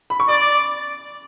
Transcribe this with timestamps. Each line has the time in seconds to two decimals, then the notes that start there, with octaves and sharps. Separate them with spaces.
0.10 B5
0.20 C#6
0.29 D5 D6